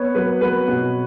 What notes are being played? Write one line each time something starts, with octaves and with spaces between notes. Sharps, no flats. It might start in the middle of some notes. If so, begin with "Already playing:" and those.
Already playing: B3 C#5
F#3 B4
F#3 B4
B2